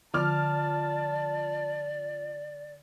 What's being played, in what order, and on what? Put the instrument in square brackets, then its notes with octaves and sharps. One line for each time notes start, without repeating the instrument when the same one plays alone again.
[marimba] D3 [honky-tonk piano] F3 D6 F6 [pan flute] D5 [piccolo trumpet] A5